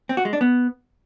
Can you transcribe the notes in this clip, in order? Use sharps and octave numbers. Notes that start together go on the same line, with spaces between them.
C4
F#4
G#3
D4
B3